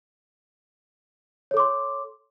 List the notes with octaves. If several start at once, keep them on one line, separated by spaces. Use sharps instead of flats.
A4 C#5 C6 D6